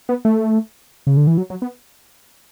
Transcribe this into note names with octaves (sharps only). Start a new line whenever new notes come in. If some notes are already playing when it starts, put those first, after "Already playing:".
B3
A3
C#3
D3
E3
F#3
F#3
B3